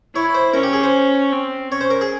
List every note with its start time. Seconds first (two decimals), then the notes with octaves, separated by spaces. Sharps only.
0.14 E4 C#5
0.35 C5
0.54 C#4 A#4
0.63 G4
0.73 G#4
0.83 C5
1.32 C4
1.72 C#4 C#5
1.81 C5
1.91 A#4
2.01 G#4